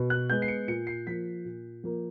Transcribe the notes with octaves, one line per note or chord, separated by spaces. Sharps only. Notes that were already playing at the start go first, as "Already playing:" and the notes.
Already playing: B2
F#6
G#3 B3 G6
C7
C#7
A#2 C#7
C7
F3 A#3 B6
A#2
F3 A#3